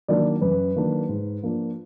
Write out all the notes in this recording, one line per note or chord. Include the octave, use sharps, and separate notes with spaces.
D#3 F#3 A#3 D4 D5
F#2 B4
D#3 F#3 A#3 D4
G#2
F3 A#3 D4